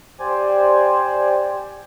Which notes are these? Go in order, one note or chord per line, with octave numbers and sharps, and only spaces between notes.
G4 C5 D5 G#5